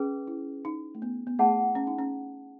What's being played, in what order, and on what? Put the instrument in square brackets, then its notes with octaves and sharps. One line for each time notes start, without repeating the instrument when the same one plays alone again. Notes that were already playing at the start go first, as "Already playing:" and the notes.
Already playing: [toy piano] C#4 G#4 B4
[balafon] E4
D#4
A3
B3
B3
[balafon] A3 [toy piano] E4 G#4 C#5 F#5 A5
[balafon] C#4
D#4
C#4